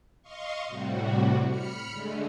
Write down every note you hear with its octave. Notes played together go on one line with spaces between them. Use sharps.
D#5 F5 C6 C#6
A2 C3 G3 F#4
B5 F6 C#7
D3 G#3 A3